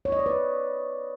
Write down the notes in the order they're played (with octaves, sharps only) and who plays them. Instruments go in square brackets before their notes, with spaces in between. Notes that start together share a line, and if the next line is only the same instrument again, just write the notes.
[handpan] C#5
D#5
D5
B4